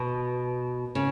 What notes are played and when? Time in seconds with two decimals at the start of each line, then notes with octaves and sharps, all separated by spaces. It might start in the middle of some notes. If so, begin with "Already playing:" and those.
Already playing: B2
0.95 C#3